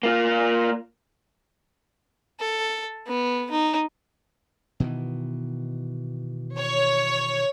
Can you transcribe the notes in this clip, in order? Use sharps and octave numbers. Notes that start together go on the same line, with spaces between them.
A#3 F4
A4
B3
D#4
B2 D#3 E3
C#5